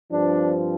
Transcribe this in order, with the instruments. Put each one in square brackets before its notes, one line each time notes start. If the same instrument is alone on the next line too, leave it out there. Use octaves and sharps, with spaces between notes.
[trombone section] G2 F3 C4 D4